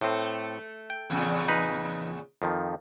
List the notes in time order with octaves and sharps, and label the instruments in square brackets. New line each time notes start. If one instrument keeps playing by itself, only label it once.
[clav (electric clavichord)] A2 C4 [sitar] A3
[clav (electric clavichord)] G5
[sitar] E2 A#2 C#3
[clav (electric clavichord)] D#4 B4
F2 D#3 F3